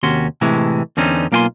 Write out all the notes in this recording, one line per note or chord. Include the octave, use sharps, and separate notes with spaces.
D#2 C3 C#4 F#4 C6
A2 C3 E3 G#3 A3
E2 D3 C4 C#4 D#4
B1 A#3 F4 G5 G#5 C6